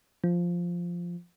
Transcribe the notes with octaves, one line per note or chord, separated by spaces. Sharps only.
F3